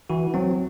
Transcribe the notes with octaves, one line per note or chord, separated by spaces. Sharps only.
E3 F#4
F#3 C4